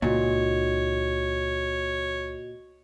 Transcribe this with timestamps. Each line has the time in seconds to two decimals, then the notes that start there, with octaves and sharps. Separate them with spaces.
0.02 C#2 A#2 D#4 F#4 C#5 D#5